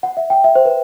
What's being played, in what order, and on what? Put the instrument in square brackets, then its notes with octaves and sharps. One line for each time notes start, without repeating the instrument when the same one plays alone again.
[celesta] F#5
E5
G5
E5
C5
B4